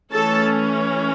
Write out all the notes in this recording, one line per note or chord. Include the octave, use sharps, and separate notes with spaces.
E3 A3 C#4 A4 A5